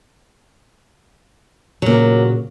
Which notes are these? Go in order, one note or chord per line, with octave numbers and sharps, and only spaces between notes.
A#2 C#3 F#3 A#3